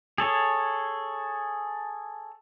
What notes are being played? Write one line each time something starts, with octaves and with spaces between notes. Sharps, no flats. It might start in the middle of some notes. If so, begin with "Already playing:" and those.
G#4 A4 C#5